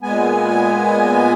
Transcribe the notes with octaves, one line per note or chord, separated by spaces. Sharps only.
A#2 G#3 B3 G#5